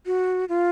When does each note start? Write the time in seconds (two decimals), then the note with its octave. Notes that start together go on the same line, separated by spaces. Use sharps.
0.06 F#4
0.49 F4